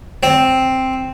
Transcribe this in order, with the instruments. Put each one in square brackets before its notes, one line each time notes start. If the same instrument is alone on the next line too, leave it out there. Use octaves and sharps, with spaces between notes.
[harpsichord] C4